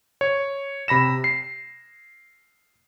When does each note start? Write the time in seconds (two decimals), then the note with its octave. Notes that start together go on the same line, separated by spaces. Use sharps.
0.21 C#5
0.88 C3 B5 A#6 E7
1.24 C7